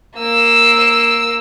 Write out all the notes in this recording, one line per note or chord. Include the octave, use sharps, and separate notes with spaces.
A#3 E6